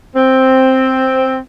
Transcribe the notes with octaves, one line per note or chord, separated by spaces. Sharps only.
C4